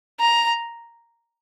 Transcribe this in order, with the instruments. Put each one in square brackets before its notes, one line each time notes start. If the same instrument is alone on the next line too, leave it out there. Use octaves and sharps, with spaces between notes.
[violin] A#5